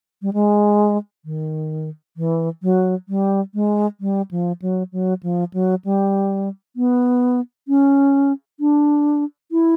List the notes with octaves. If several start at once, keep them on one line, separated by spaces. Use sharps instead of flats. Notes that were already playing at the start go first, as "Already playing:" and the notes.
G3
G#3
D#3
E3
F#3
G3
G#3
G3
F3
F#3
F#3
F3
F#3
G3
B3
C#4
D4
E4